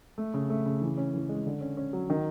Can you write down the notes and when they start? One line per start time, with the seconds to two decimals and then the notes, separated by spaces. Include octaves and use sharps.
0.18 A3
0.34 C#3
0.50 A3
0.66 C#3
0.82 E3
0.97 C#4
1.14 E3
1.29 G#3
1.46 D3
1.61 C#4
1.77 C#4
1.93 F#3
2.10 D#3